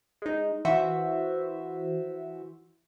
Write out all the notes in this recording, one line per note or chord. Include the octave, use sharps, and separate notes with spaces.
G#3 D#4
E3 F#4 C5 E5